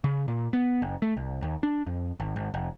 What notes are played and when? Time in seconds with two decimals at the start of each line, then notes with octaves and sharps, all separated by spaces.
0.04 C#3
0.28 A#2
0.53 B3
0.82 F#1
1.02 A3
1.17 C2
1.42 D#2
1.63 D4
1.87 F2
2.20 G#1
2.36 G#1
2.54 F1